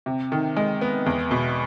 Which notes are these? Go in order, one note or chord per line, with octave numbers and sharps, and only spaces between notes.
C3
D#3
G#3
B3
E2
B2